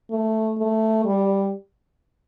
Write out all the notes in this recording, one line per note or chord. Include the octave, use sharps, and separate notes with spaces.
A3
A3
G3